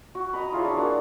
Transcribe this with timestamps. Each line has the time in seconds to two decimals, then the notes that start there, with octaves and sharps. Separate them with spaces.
0.15 F#4
0.33 D#5 A#5 B5
0.52 E4 F4 G#4 C#5
0.64 D4 F#5
0.77 A#3 F#4 G#4